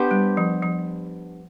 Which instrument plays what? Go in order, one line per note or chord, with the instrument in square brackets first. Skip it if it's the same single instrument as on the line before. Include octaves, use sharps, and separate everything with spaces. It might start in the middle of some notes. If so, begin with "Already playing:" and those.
Already playing: [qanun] B3 D4 G4 C5
[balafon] G3
F3
F3